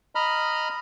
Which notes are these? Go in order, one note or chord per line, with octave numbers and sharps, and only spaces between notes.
D#5 A#5 B5 F6